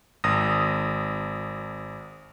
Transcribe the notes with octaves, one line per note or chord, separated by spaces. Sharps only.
G#1 D#6 A#6